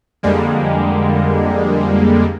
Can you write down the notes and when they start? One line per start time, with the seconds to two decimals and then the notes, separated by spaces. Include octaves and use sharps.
0.23 F2 D3 G3 G#3 A#3